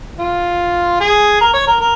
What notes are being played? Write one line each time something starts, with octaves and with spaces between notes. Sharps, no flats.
F4
G#4
A#4
C#5
A#4
A#4